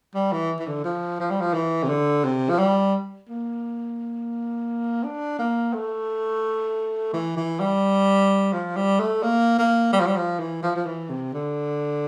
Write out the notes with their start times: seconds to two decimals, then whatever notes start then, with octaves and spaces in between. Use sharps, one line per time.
0.15 G3
0.32 E3
0.59 E3
0.67 D3
0.84 F3
1.20 F3
1.31 G3
1.40 F3
1.54 E3
1.83 C3
1.89 D3
2.24 C3
2.50 F3
2.58 G3
3.29 A#3
5.04 D4
5.39 A#3
5.73 A3
7.13 E3
7.37 E3
7.60 G3
8.53 F3
8.76 G3
9.00 A3
9.23 A#3
9.58 A#3
9.93 G3
10.00 F3
10.07 G3
10.16 F3
10.39 E3
10.63 F3
10.76 F3
10.86 E3
11.10 C3
11.33 D3